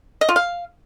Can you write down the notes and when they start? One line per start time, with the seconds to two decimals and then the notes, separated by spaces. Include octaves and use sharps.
0.21 D#5
0.29 F4
0.36 F5